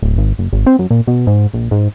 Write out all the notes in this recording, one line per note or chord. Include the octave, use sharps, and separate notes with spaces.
D1
G#1
F#1
G#1
C4
F#2
A#2
B2
G#2
A#1
G#2